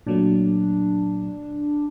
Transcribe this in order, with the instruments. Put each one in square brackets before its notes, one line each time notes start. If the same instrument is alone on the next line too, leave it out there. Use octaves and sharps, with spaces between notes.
[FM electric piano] A#2 F#3 A3 [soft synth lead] D4